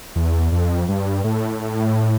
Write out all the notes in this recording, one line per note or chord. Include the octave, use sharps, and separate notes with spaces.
E2
F2
G2
A2